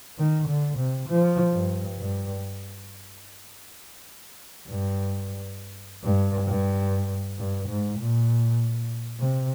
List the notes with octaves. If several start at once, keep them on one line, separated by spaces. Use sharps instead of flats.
D#3
D3
C3
F3
G2
G2
G2
G2
G2
G2
G#2
A#2
C3